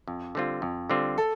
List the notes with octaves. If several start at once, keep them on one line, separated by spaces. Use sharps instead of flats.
F2
D3 G3 C4 F4
F2
D3 G3 C4 F4
A4